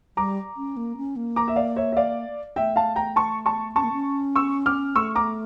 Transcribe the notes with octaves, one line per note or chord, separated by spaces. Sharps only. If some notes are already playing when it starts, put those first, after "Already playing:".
G3 A#5 D6
C#4
A#3
C#4
A#3
A#5 D6
E5
D5 F5
C#5 E5
E5
D5 F5
A3 E5 G5
F5 A5
G5 A#5
A5 C#6
A5 C#6
C#4 A5 C#6
A#3
C#4
C#6 E6
D6 F6
A3 C#6 E6
A#5 D6